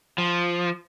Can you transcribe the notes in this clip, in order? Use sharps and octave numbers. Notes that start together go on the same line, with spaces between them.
F3